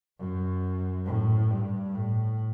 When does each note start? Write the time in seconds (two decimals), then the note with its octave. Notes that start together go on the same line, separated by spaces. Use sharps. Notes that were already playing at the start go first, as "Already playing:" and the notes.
0.19 F#2
1.06 A2
1.51 G2
1.94 A2